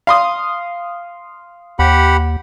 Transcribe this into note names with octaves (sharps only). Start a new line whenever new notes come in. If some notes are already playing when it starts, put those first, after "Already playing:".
F5 C6 D#6
D#2 G4 F#5 B5